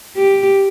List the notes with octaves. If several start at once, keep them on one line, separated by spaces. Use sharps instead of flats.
G4